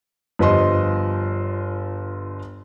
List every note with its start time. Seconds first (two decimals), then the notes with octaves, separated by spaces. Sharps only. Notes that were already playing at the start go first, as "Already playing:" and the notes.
0.39 G1 F3 B4 C5 D#5 C6